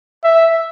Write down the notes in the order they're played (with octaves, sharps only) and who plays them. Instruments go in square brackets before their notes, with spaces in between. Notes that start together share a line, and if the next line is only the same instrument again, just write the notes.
[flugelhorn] E5